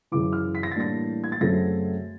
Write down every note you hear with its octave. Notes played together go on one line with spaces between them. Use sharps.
F#2 C#3 E3 D6
F6
B6
A#6
A6
A2 E3 G3 A#3 D4 A#6
G#6
A6
F#2 C#3 F#3 A3 C4 A#6